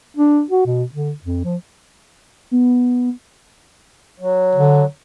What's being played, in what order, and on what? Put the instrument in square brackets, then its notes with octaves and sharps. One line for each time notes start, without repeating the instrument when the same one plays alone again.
[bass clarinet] D4
F#4
B2
D3
F2
F3
[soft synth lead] B3
[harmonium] F#3
[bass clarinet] D3